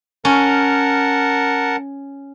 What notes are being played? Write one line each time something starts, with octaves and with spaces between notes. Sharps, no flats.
C#4 A#4 F#5 A5